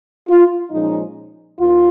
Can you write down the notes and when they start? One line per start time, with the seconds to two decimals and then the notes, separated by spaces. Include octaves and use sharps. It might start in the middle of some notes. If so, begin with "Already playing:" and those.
0.28 F4
0.71 A#2 F3 G#3 C#4 D#4
1.59 D#2 D#3 F4